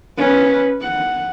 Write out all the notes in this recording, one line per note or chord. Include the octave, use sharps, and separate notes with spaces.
C#4 B4
F#5